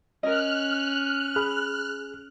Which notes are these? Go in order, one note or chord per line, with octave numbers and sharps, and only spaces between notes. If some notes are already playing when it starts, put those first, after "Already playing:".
C#4 A#4 D#5 F6 F#6
G#4 B5